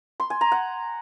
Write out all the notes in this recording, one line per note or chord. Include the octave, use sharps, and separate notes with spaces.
C6
G#5
A#5
F#5